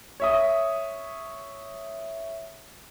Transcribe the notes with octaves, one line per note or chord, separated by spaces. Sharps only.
C#5 E5 D#6